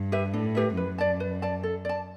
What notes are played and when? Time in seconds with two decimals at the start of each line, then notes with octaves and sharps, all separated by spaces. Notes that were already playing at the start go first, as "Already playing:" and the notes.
Already playing: G2
0.12 G4 B4 E5
0.33 A2 D4
0.55 G4 B4 E5
0.77 F#2 B4
0.98 D5 A5
1.20 B4
1.42 D5 A5
1.63 A4
1.85 D5 A5